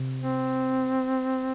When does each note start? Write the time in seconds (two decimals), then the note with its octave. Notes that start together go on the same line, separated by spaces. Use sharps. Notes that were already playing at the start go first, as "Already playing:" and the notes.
Already playing: C3
0.22 C4